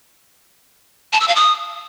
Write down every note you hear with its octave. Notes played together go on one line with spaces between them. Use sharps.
A5
E6
F5
D#6